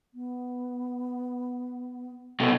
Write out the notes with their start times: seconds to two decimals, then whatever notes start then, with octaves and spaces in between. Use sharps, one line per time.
0.14 B3
2.40 C2 B2 A4